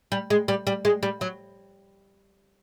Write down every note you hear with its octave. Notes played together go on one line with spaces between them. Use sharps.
G3
G#3
G3
G3
G#3
G3
F#3